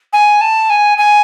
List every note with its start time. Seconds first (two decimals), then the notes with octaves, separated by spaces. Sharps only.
0.13 G#5
0.41 A5
0.70 G#5
0.98 G#5